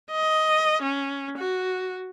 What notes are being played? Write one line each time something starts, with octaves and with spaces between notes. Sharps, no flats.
D#5
C#4
F#4